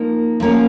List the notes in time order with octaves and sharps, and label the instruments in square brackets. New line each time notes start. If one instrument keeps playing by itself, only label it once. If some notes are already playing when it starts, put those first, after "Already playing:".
Already playing: [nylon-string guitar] F3 A#3 D#4 A#4
F3 A#3 C#4